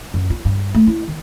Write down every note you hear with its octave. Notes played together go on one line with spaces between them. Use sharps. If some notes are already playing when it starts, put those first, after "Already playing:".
F#2
F4
G2
A3
E4
D#3